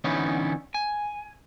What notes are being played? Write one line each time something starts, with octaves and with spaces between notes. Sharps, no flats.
D3 E3 B3 C#4 D#4 E4
G#5